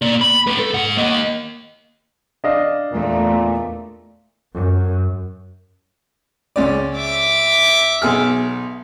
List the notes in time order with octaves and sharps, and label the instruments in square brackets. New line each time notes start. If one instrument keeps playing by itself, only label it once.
[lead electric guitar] A#3 D5
B5
A3 B4
A4
G#2 F#5
A#3 D#5
[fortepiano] D4 D#5 F5
[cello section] E2 A3 [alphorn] A#2
[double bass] F#2
[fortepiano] C#2 C#4 D5
[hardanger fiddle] E5 D6
[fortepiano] B1 G#4 F6